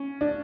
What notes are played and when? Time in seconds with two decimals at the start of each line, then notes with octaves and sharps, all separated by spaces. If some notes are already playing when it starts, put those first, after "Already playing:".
Already playing: C#4
0.21 D4